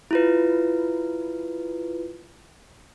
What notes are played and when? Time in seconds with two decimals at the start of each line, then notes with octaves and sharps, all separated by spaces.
0.11 E4 F4 B4